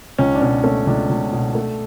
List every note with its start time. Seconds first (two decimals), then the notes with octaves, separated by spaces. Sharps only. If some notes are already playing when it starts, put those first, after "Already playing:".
0.18 C#2 C#4
0.35 D4
0.41 B2 C#4
0.64 A3 C#4
0.87 C#2 D4
1.09 C#2
1.33 B2
1.55 A3